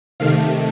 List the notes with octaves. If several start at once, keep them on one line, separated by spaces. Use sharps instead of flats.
C3 D#3 A3 F5